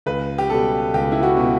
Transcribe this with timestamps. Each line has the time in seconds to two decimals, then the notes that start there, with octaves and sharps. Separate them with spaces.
0.06 C#2 B4
0.38 G4
0.50 B2 G3 A4
0.94 C#2 G4
1.12 E4
1.23 F#4
1.37 B2 G3